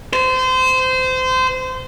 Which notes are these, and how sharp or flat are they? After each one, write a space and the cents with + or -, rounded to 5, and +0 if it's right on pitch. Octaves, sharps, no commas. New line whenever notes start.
C5 -25